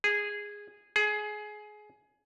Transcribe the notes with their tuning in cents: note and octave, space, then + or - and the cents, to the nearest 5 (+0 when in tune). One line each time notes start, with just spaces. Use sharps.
G#4 -10
G#4 +20